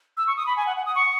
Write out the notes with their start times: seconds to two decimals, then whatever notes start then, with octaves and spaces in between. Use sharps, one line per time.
0.17 E6
0.27 C#6
0.37 D#6
0.47 B5
0.57 G#5
0.67 F#5
0.77 F#5
0.86 D#6
0.95 C#6